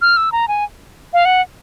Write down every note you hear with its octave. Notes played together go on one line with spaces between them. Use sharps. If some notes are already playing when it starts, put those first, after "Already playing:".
F6
E6
A#5
G#5
F5
F#5